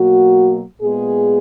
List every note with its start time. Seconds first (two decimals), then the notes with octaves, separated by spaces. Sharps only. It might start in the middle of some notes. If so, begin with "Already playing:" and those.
Already playing: B2 F#3 A#3 F#4
0.81 A#2 G#3 B3 G#4